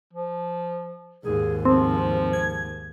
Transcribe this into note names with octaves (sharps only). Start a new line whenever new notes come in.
F3
D#2 G#2 G#4
F3 C4
G#6